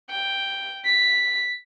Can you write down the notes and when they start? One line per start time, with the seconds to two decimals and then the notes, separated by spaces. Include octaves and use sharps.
0.10 G5
0.85 B6